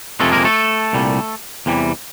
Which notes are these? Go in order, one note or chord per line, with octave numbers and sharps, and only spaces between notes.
F2 C3 F3 G#3 A3 A4
A#3 A#4
A3 A4
C2 A#2 G3
E2 C3 E3 G3